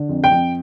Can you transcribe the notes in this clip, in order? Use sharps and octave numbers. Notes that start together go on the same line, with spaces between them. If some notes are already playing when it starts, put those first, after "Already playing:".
Already playing: D3
F2
G5
F2